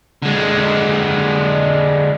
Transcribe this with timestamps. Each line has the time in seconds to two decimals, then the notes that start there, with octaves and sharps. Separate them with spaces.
0.22 D3 G#3